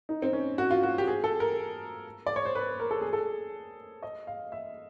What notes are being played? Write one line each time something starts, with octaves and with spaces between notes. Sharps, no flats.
D#4
C4
C#4
F#4
F4
F#4
G4
G#4
A4
A#4
D5
C#5
C5
B4
A#4
A4
G#4
A4
D#5
F5
E5